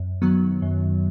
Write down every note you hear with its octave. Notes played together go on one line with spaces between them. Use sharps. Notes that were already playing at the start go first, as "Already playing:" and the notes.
Already playing: F#2
D#3 F#3 B3
F#2